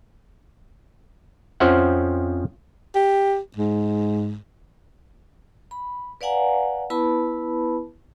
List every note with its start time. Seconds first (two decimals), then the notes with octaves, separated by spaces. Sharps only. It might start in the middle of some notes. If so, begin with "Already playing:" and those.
1.60 F2 F3 C#4 C5 E5 F#5
2.95 G4
3.56 G#2
5.71 B5
6.21 B4 D5 F5 F#5 G#5 A#5
6.90 B3 E4 B4 A5 B5